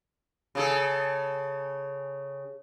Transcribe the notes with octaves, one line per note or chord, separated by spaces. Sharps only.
C#3 G#4 A4